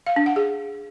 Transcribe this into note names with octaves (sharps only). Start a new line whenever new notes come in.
F5
D4
F#5
G#4